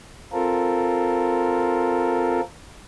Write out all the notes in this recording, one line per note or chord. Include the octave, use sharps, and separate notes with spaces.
C4 F4 A4 A#4